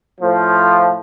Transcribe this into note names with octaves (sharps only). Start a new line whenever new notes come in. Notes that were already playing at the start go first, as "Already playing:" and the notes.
A2 F3